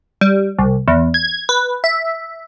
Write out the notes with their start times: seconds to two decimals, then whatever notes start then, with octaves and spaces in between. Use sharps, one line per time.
0.21 G3
0.59 C2
0.88 E2
1.14 G#6
1.49 B4
1.84 E5